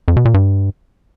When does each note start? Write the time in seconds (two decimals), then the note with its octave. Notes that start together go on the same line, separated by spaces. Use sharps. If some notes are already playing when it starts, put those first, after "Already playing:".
0.08 F2
0.17 B2
0.25 A#2
0.34 G2